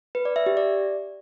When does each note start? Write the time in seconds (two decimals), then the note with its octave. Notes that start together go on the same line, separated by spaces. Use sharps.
0.15 B4
0.25 D5
0.36 E5
0.46 G4
0.57 D5